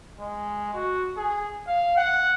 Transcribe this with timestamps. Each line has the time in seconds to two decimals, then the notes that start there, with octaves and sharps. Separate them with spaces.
0.20 G#3
0.74 F#4
1.17 G#4
1.67 F5
1.97 F#5